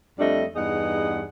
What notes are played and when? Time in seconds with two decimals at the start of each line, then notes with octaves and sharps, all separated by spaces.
0.19 F2 G3 A3 D4 D#5
0.56 E2 G2 D#4 G#4 F#5